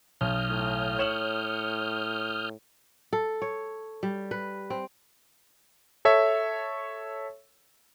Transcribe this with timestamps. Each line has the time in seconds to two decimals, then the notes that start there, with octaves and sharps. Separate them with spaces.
0.21 B1 D#6 F6 G6
0.50 A2
0.99 C#5 E7 F#7
3.13 A4
3.42 C#5
4.03 G3
4.31 B4
4.70 C4
6.05 A4 C#5 E5